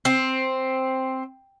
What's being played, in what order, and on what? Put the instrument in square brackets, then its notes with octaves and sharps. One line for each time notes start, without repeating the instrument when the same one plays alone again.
[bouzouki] C4